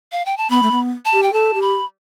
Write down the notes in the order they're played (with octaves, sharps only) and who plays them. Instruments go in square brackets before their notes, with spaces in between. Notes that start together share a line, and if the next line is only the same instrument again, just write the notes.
[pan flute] F5
G5
A5
[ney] B3 [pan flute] B5
[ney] A3
B3
[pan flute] A5
[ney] G4
[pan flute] G5
[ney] A4 [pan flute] A5
[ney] G4
[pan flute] B5